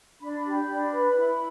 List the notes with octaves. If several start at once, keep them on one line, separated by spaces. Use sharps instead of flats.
D4 B5
B5
G4
D4
B4
E4